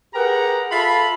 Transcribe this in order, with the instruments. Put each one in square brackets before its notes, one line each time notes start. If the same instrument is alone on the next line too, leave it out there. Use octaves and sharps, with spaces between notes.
[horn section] G4 G#4 A#4 B4 F#5 A#5
F4 A4 E5 B5